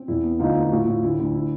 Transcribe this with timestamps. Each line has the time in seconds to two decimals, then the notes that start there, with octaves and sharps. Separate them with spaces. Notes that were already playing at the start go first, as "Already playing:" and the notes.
Already playing: C4
0.08 E2 E4
0.24 B3
0.39 D2 D#4 F4
0.52 A#3 E4
0.62 F4
0.71 A2 E4 F#4
0.81 F4
0.87 A2 E4
1.03 D2 E4
1.19 D2
1.34 E4